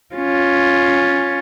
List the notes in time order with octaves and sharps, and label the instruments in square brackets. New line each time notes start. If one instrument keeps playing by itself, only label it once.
[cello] C#4 F4